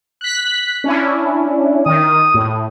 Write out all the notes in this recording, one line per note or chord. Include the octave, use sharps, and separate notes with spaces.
F#6 B6
C#4 D4 E4
D#3 D#6
A2